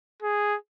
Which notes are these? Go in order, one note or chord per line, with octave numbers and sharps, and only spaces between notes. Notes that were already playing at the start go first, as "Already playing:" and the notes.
G#4